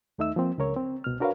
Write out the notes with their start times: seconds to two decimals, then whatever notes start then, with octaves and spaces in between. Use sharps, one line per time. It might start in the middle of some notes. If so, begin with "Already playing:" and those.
0.18 D#2 A3 D#4 E5 E6
0.36 F3 A#3 C4
0.58 C#2 C#3 A#4 C#5
0.76 C4
1.04 C2 B2 F6
1.20 D4 F#4 A#4 B4 C#5 F5